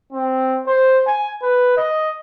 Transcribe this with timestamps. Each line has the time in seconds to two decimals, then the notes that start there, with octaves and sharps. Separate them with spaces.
0.13 C4
0.67 C5
1.07 G#5
1.43 B4
1.77 D#5